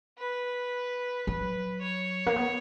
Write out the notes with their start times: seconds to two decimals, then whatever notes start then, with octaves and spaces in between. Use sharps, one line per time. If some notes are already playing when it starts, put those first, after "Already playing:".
0.18 B4
1.27 F#3 B4
1.82 C#5
2.27 A#3
2.36 B3